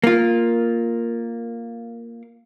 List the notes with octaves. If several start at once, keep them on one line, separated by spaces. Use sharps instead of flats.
A#3 F4